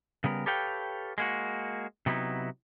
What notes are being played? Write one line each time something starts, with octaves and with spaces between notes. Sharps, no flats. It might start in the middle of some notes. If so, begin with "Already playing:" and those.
C#3 G3 B3 A#4
G4 A4 B4 C#5 F5 G5
G#3 A#3 F#4
C3 F#3 B3 D#4 E4